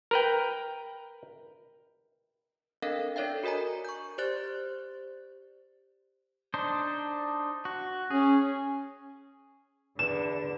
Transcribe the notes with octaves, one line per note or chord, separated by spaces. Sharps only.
A#4 B4 G5
C4 D4 A4 A#4 D#5 F5
D4 A4 C#5 D5 E5 G5
F#4 A#4 D#5 G#5 A#5
C#6 G6
G4 C5 D5 F#6 A6
D4 D#4 C5
F#4
C#4 G#4
E2 D3 E7